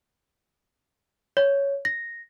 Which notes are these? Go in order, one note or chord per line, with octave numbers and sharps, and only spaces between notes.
C#5
A#6